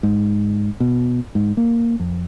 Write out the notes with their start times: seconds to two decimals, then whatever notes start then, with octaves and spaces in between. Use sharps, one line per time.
0.03 G#2
0.80 B2
1.35 G#2
1.57 A#3
2.00 F2